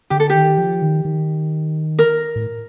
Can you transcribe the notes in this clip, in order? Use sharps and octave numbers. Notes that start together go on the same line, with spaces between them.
D3 G4
A4
D#3 G4
F3
D#3
D#3
A#4
A2